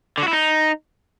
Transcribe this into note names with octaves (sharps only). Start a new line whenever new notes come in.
D3
F#4
E4
D#4